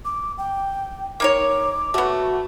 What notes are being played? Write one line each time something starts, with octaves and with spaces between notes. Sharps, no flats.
D6
G5
A#3 D#4 C#5 D6
A3 B3 F#4